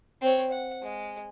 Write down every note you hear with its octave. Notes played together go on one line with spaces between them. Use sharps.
C4 C#5
F#5
G#3